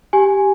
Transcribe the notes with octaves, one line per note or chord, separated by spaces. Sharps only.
G4 G#5